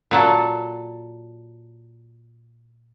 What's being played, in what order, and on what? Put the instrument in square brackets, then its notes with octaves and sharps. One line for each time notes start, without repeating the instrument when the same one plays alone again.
[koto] A#2 F#3 A4